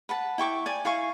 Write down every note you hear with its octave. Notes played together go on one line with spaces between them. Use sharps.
B4 F#5 A5
E4 G5 C#6 D6
D5 G#5
E4 F5 G#5 C#6